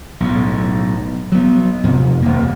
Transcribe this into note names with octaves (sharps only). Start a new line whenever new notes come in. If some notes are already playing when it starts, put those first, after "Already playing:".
B1 A2
F#3 B3
F2 C3
D#1 A#3